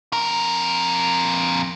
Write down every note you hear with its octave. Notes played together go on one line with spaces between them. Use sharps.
F2 A#4